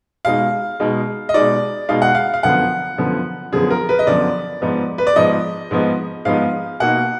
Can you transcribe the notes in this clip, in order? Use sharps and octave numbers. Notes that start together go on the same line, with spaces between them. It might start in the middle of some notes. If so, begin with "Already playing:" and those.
B2 G#3 D#4 F5
B2 G#3 D#4
D#5
B2 G#3 D#4 D5
B2 G#3 D#4 F5
F#5
F5
F5
F#2 D3 F3 B3 F#5
F#2 D3 F3 B3
F#2 D3 F3 B3 G#4
A#4
B4
D#5
F#2 D3 F3 B3 D5
G#2 F3 B3 D#4
B4
D5
G#2 F3 B3 D#4 D#5
G#2 F3 B3 D#4
G#2 F3 B3 D#4 F5
B2 A#3 D#4 F#5